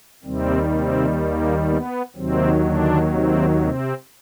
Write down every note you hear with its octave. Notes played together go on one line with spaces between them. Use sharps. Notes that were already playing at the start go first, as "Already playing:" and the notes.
D#2 C3 D#3 G3 C4
C3 C4
A#3
B3
D#2 C3 D#3 F#3 C4
D3 D4
C3 C4
C3 C4